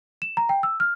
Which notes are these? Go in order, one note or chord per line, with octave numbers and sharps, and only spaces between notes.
E7
A#5
G5
E6
F6